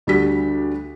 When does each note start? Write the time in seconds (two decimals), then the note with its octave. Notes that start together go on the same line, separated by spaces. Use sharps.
0.07 D2 G3 D4 F#4 G4 B6